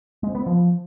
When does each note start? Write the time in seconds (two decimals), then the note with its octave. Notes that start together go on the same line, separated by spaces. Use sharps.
0.23 G#3
0.29 C4
0.35 B3
0.41 C4
0.47 F3